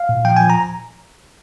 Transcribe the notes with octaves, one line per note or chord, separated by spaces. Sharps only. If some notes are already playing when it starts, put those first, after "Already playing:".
Already playing: F5
A#2
F3 G5
F3 G#5
A#5